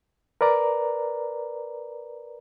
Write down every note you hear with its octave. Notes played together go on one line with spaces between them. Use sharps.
A#4 B4 D5 A#5